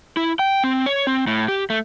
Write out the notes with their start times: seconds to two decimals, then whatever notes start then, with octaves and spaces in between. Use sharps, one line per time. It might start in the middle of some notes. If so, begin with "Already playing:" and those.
0.17 E4
0.39 G5
0.64 C4
0.86 C#5
1.07 C4
1.27 A2
1.48 G4
1.70 A3